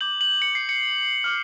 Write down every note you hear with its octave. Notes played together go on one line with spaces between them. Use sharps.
D6 G6 F#7
F#7
C#7
C7
C#7
D6 F6